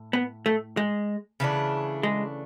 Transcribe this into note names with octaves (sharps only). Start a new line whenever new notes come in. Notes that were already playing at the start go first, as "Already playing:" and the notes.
Already playing: A2
B3
A3
G#3
C#3 E3 A3 D4
G#3